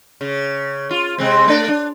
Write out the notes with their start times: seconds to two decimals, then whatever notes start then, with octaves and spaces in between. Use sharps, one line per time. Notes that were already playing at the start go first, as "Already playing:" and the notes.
0.21 C#3
0.91 F4
1.18 C3 G#3 C4
1.48 A3 D4 D5
1.68 D4